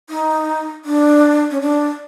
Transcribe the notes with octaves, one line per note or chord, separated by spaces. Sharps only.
D#4
D4
C#4
D4